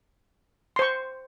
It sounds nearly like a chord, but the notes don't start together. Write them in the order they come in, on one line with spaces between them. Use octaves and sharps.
C6 C5 C#6